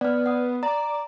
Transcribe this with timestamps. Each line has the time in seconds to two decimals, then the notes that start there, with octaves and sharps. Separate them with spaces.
0.01 B3 D5 F6
0.26 F#5 D#6
0.63 D5 A#5